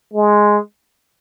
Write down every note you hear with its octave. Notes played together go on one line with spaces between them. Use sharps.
G#3